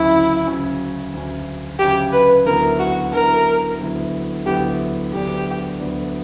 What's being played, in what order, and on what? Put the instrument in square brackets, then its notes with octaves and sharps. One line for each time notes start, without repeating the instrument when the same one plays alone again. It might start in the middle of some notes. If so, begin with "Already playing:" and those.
Already playing: [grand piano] D2 C#3 F#3 C#4 [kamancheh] E4
[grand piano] D2 C#3 F#3 C#4
D2 C#3 F#3 C#4
[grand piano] D2 C#3 F#3 C#4 [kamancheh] G4
[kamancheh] B4
[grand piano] D2 D3 F#3 B3 E4 [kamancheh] A#4
[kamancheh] F#4
[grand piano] D2 D3 F#3 B3 E4 [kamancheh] A#4
[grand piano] D2 D3 F#3 B3 E4
[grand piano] D2 D3 F#3 B3 E4 [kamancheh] G4
[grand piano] D2 D3 F#3 B3 D4 [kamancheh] G4
[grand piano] D2 D3 F#3 B3 D4